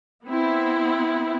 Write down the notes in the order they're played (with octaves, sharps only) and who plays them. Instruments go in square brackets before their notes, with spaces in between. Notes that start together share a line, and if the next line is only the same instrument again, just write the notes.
[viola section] B3 C4 E4